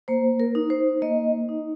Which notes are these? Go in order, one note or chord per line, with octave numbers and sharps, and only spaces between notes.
A#3 C5
A#4
D#4
C5
A#3 D#5
D#4